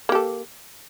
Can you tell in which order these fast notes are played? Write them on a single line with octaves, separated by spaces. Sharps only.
A#3 G4 A4